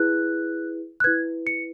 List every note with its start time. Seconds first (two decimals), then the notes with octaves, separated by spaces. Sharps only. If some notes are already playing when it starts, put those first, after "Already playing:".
Already playing: E4 G#4 B4 F#6
1.00 F#6
1.04 E4 B4 G#6
1.47 C#7